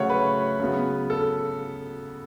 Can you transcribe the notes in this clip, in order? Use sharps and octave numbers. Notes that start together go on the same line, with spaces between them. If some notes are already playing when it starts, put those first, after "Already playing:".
Already playing: C#3 F#3 A3 C#5 F#5
B4
C#3 F#3 B3
A4